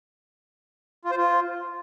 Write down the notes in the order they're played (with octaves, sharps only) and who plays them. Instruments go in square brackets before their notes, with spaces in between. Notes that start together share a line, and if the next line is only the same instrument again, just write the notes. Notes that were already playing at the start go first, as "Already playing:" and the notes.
[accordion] F4
C5
F4